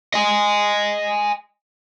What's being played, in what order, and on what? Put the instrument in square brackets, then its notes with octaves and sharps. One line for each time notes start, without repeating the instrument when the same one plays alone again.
[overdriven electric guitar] D#5 G#5